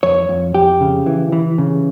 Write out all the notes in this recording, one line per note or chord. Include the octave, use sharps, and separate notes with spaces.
F2 C#5
F2
F2 G4
C#3
E3
E3
C#3